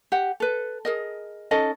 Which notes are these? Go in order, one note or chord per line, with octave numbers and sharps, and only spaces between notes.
G4 F#5
A4 B4
G#4 A#4 D#5
C#4 D#4 A4 D#5